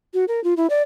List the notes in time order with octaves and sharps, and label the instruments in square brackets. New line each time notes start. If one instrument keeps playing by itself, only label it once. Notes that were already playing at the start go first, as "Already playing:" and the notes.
[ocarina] F#4
A#4
F4
E4
D5